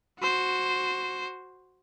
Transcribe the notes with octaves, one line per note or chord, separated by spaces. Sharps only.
F#4 C5